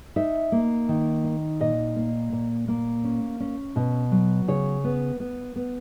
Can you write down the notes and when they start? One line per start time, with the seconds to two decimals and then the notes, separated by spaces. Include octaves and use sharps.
0.16 D#4 E5
0.52 A#3
0.89 D#3
1.24 D#4
1.60 A#2 D#5
1.96 A#3
2.32 A#2
2.68 A#3
3.04 C#4
3.40 C#4
3.76 B2
4.12 F#3
4.48 C#3 C#5
4.84 B3
5.20 B3
5.56 B3